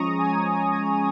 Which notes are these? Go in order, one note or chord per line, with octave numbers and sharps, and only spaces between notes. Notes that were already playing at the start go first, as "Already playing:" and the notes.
Already playing: F3 G#3 C#4 A#5 C#6 D#6
G#5